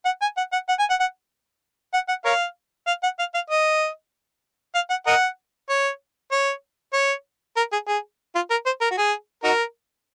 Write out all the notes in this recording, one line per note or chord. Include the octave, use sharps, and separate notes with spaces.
F#5
G#5
F#5
F#5
F#5
G#5
F#5
F#5
F#5
F#5
A#4 C#5 F5
F5
F#5
F5
F5
D#5
F5
F#5
A#4 D#5 F#5
C#5
C#5
C#5
A#4
G#4
G#4
F4
A#4
C5
A#4
F#4
G#4
D#4 F#4 A#4